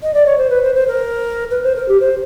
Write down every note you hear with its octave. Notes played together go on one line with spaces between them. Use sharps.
D#5
D5
C#5
C5
B4
C5
C5
A#4
B4
C5
A#4
G4
C5